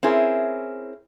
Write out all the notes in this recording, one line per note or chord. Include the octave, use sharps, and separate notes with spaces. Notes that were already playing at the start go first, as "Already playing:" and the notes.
C4 C#4 E4 G#4 A#4